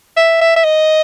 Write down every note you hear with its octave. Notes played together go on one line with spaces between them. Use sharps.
E5
E5
E5
D#5